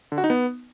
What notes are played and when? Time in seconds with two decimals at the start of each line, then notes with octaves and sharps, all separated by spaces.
0.12 D3
0.18 F#4
0.24 D#4
0.30 B3